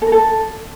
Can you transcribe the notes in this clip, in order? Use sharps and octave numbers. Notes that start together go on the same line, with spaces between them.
A4
A#4
A4